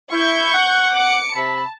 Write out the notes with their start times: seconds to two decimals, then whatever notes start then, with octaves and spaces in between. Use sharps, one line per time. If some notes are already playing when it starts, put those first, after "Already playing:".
0.12 E4 C#6 G6
0.54 F#5
0.93 D6 C#7
1.35 C3 E5 A5 B5